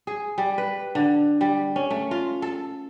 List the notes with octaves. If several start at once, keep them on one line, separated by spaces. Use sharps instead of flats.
G#4
G3
B4
D3
G3
C#4
A3
F4
A4